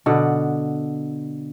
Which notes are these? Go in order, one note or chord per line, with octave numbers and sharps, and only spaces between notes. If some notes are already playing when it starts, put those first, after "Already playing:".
B2 D3 F#5